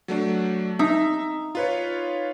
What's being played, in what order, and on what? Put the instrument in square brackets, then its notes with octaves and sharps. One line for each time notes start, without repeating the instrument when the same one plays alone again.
[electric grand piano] F#3 A3 D4
[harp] D#4 [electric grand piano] E5
[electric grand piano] F4 B4 C#5